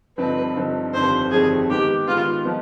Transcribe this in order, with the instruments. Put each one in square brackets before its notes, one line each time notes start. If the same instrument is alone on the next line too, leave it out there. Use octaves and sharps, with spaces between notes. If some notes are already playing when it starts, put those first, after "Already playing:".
[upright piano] G2 D3 F3 C4 D#4 [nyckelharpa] B4
[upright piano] G2 D3 F3 C4 D#4
[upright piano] G1 F2 D#3 G3 C4 [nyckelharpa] C5
[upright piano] G1 F2 D#3 G3 C4 [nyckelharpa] G#4
[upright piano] G#2 D#3 G#3 B3 [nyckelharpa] G4
[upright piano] G#2 D#3 G#3 B3 [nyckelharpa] F4
[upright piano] F3 B3 D#4